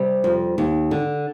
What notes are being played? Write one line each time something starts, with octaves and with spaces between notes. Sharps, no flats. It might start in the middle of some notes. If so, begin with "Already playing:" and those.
Already playing: C3 G3
F2
D#2
D3